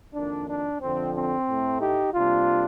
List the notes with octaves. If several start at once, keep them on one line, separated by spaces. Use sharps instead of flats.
F2 D#3 A#3 D4
D4
F2 D3 F3 C4
C4
A2 A3
D#4 G4
C3 G3 A#3 D4 F4